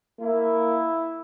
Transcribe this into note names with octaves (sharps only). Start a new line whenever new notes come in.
A#3 E4